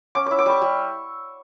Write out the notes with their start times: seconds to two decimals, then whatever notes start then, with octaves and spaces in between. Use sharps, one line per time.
0.15 C#4 D6
0.26 E4 D6
0.39 D6
0.46 G3 C#6
0.61 G3